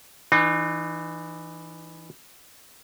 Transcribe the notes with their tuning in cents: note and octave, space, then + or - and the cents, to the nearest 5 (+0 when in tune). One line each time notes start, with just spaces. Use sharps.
E3 +0 D#4 -40